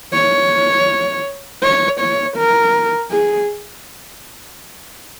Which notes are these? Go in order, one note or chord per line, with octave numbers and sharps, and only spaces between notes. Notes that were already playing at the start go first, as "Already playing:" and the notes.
C#5
C#5
C#5
A#4
G#4